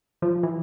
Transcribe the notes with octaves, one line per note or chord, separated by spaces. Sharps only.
F3
E3